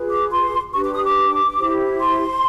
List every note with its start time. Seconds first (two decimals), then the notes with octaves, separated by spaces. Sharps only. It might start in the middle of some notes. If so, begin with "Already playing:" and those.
Already playing: F4 G#4 B4
0.10 D6
0.31 C6
0.73 D4 G4 B4 C#6
0.84 D6
0.94 D#6
1.05 D6
1.57 E4 G4 C5
1.99 C6